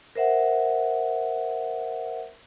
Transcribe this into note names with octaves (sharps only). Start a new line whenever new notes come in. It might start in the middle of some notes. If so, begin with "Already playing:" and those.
A#4 C5 E5 F#5